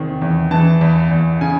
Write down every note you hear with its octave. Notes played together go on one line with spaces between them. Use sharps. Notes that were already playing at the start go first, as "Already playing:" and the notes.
Already playing: E2 C3 D#3 C5
E2
E3 A5
E2
E2
C#3 G#5